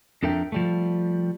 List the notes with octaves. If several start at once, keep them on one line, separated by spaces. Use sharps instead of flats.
F2 D4 A4 A#4 E5 G5
F3 G3 A3